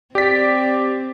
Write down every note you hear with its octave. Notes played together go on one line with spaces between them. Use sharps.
C4 G4 D5 B6